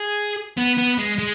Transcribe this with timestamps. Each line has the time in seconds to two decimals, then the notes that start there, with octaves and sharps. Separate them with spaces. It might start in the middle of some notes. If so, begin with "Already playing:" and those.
Already playing: G#4
0.57 B3
0.78 B3
0.98 G#3
1.19 G#3